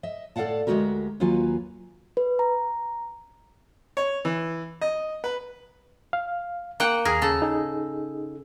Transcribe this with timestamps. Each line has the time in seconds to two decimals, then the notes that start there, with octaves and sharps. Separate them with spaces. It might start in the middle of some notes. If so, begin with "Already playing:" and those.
0.03 D#5 E5
0.36 A2 A4 D5 F5 F#5 A5
0.67 D2 G#3 C#4 F#4 G4 A#4
1.20 D#2 F#3 A#3 F4 B4 G#5
2.17 B4
2.39 A#5
3.97 C#5
4.25 E3
4.81 D#5
5.24 B4
6.13 F5
6.80 A#3 F#5 G5
7.05 D#2 G#4 A#4
7.22 C#3 A4
7.42 D#4 G#4